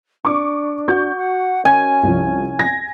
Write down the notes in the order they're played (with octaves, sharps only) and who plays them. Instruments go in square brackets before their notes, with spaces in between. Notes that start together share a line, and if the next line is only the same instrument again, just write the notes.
[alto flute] D4 [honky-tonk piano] C#6 D6
[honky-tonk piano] F#4 C#6 G6
[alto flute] F#5
[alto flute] C#4 [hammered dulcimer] G#5
[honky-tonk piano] C2 F3
G#6 A#6